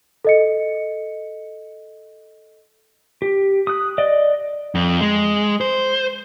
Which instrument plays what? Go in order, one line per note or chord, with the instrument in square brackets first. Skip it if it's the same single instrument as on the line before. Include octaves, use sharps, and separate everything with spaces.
[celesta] A4 D#5 C#7
[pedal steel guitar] G4
D#6 F#6
D5 D#5
[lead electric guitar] F2
G#3
C5